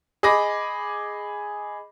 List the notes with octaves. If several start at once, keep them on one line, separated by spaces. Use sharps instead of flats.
G#4 D#5 B5 D6 A#6